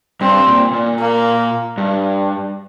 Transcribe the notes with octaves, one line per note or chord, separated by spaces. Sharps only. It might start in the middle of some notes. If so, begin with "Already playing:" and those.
G2 C4
A#2
A#2
A#3
G2